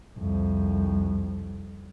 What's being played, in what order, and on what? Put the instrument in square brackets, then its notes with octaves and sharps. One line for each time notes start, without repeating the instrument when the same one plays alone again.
[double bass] C2 F2